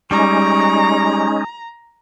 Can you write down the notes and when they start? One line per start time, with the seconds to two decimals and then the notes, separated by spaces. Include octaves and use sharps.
0.11 G3 G#3 C#4 D#4 A#5 C#6